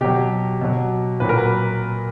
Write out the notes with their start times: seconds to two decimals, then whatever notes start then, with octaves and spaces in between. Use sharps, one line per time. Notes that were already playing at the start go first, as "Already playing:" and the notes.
0.01 B2 F#3 G4
0.61 B2 F#3
1.20 A#2 F#3 B4
1.29 A#4
1.38 B4